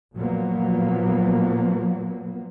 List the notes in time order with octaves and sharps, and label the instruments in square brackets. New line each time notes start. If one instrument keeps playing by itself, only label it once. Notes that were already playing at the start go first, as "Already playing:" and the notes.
[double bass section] A#2 F3 F#3 A#3 B3